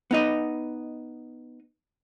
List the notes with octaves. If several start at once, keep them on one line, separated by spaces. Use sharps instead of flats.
B3 D#4 D#5